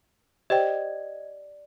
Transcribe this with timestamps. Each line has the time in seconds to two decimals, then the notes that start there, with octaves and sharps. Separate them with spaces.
0.50 G4 C5 D5 D#5 G5